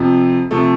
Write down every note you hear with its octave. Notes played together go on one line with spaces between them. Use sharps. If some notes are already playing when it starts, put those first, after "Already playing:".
Already playing: F2 C3 F3
C3 F3 A3